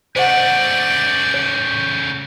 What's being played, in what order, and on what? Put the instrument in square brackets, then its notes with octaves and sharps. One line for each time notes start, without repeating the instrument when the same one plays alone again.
[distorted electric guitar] C#3 A3 [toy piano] C5 D#5 F#5 [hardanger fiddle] D5 [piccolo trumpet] G6
[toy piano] C#5